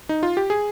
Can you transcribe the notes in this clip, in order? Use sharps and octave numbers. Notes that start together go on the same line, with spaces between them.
D#4
F4
G4
G#4